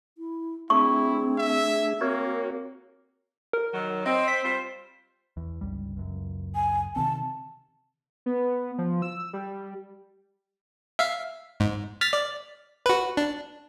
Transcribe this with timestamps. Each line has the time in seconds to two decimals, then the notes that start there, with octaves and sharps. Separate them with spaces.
0.18 E4
0.70 A3 C4 D4 E4 G#4 C#6
1.38 E5
2.01 A#3 C4 F#4 A#4 C#5
3.53 A#4
3.74 D#3 F#3
4.06 C4 D#5
4.28 B6
4.43 G3 F4 C5
5.37 E2
5.61 G1 C#2 G3
5.97 C#2 F#2
6.55 G#5
6.96 C3 D#3 C4 A5
8.26 B3
8.78 F3
9.02 E6
9.33 G3
10.99 E5 F5
11.60 G#2
12.01 F6 A6 B6
12.13 D5
12.86 F#4 B4
13.17 D4